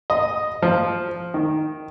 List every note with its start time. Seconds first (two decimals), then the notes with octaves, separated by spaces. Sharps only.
0.10 D#5
0.62 F3
1.34 D#3